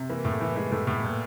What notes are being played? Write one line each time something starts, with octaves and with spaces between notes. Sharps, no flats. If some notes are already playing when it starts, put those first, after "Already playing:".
Already playing: C3
E3 A#3
A2
A3
E3
E3 G#3
A2 A3
A2 B3
A#2